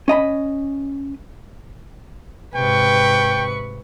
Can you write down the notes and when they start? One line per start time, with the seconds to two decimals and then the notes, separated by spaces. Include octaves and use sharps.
0.08 C#4 D#5 A#5 B5
2.55 G#2 C3 B4 G5 C#6